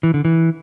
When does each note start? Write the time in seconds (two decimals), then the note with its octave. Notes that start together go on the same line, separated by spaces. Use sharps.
0.03 E3
0.14 D3
0.25 E3